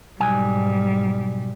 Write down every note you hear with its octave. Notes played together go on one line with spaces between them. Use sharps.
B1 G#2 G3 G#5